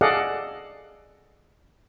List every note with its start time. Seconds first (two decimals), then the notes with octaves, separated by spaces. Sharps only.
0.01 G#4 A4 D5 D#5 F5 F#5